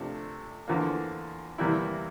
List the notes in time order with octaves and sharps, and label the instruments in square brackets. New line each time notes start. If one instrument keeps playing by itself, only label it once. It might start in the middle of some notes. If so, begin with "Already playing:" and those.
Already playing: [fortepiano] C3 F3 A3 D4
E2 D3 F3 A#3
E2 C3 G3 A#3 E4